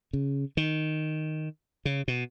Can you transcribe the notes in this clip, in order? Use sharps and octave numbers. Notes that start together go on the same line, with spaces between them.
C#3
D#3
C#3
B2